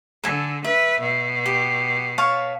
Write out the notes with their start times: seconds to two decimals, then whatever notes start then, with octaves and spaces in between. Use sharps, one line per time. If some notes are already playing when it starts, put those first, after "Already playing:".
0.24 D3 A4 G#5
0.64 B4 E5
1.00 B2
1.46 G4
2.18 C#5 F5 A5